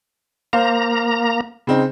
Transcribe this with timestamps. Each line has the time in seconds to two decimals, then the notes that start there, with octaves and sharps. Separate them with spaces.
0.53 A#3 C5 F5 A#5
1.67 C#3 C4 D#4